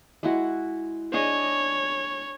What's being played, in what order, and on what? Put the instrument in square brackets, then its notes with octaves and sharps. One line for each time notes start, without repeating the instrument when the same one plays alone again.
[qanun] G#3 E4 F#4
[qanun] D4 G#4 D#5 [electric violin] C#5